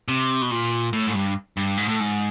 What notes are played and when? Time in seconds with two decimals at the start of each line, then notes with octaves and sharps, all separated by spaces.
0.08 C3
0.42 B2
0.51 A#2
0.93 A2
1.07 G#2
1.14 G2
1.57 G2
1.77 G#2
1.88 A2
2.00 G#2